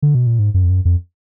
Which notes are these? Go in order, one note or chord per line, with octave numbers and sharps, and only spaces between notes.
D3
B2
A#2
G#2
F#2
F2
F#2
F2